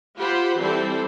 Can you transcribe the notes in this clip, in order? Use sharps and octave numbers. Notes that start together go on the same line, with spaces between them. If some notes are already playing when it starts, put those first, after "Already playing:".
F4 G4 C5 F#5 B5
E3 G3 C4 E4 A4 C5